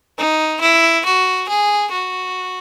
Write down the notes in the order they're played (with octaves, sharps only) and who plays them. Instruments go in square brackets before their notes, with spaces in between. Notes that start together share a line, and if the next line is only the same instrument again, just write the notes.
[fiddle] D#4
E4
F#4
G#4
F#4